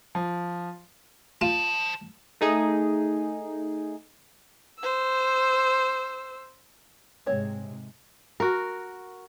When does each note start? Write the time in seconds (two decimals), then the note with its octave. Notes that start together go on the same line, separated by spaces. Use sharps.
0.15 F3
1.41 F4 C5 A5
2.41 A3 D#4 G#4
4.79 C5 E6
7.26 G#2 C3 G#3 C4 C#5
8.40 F#4 A#4